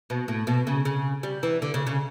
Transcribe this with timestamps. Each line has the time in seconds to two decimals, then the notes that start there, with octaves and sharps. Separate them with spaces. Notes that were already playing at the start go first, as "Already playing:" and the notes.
0.10 B2
0.28 A2
0.47 B2
0.67 C#3
0.85 C#3
1.23 G3
1.43 E3
1.62 D3
1.74 C#3
1.87 C#3